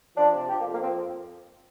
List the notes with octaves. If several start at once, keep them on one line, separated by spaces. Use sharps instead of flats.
F3 D4
C3
F3 G4
A#3
F2
A#3
F3 C4